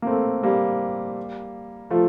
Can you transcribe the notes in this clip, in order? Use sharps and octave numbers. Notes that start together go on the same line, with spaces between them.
A#3
A3 C4
G3 A#3
F3 A3